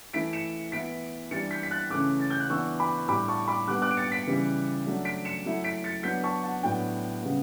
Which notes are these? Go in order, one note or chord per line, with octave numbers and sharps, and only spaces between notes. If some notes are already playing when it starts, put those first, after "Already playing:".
E3 A3 E4 B6 D7
C#7 E7
E3 B3 E4 B6 D7
E3 G3 D4 A6 C#7
G6 B6
B6
F#6 A6
C#3 E3 A3 C#4 D6 F#6
A6
G6
F#6
E3 B3 D4 C#6 E6
B5 D6
A2 G3 D4 B5 D6
A5 C#6
B5 D6
D3 G3 B3 D6 F#6
D6 F#6
D7
A6 C#7
B6 D7
C#3 E3 G3
F#3 A3 D4
B6 D7
C#7 E7
F#3 A3 E4
B6 D7
A6 C#7
F#3 B3 D4 G6 B6
A5 C#6
F#5 A5
A2 F#3 B3 D4 G5
C#3 G3 B3